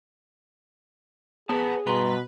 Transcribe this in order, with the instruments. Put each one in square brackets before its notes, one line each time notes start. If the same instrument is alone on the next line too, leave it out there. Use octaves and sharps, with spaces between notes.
[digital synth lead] B3 [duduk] G#4 [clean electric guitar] B4 C#5 A5
[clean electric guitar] G2 A#5 C6 [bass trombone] B2 [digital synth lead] B4